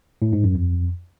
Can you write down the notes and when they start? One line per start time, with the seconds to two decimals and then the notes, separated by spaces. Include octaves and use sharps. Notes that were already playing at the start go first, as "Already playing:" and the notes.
0.22 A2
0.33 G#2
0.44 F#2
0.55 F2